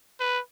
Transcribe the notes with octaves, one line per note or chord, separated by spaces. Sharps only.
B4